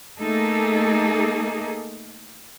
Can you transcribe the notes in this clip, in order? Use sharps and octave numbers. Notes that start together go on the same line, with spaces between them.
A3 A#3 D#4 G#4 A4